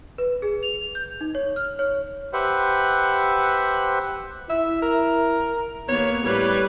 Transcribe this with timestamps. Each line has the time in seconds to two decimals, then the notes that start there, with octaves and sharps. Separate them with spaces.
0.18 B4
0.42 G#4
0.63 F7
0.95 G6
1.21 D#4
1.35 C#5
1.56 F6
1.79 C#5
2.33 G4 B4 C5 E5 F#5
4.49 E4 E5
4.82 A#4
5.88 D#2 A#3 B3 C#5
6.24 A2 G3 B4 C#5